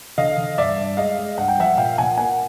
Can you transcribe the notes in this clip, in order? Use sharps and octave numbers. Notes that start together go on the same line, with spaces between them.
D3 D#5 F5
D3
G2 D5 E5
G2
G#3 D#5 F5
G#3
G2 F#5
G5
F3 E5 F#5
A#2 F5 G5
A#2 F#5 G#5
A#3 F#5 G#5